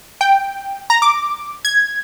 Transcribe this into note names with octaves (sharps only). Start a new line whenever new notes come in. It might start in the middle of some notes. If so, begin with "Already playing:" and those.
G5
A#5
D6
G#6